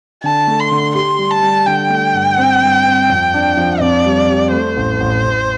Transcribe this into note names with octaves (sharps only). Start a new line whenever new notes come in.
D3 A5
A3
C6
D3
G4 C6
G3
A5
G3
D3 G5
A3
G2
C4
G2
C4
F2
D4
F3
F2 D5
G3
G3
A3 C5
A1
A1
A1